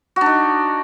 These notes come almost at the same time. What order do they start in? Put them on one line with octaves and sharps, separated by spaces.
F#4 D4 D#4